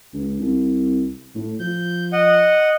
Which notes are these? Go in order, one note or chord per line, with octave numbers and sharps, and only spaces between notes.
C#2
C2
A2
F3 G6
D#5 F#5